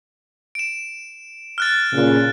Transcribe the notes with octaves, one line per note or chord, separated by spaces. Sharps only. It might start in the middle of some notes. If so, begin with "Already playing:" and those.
D7 E7
F6 F#6 A6
A#2 C#3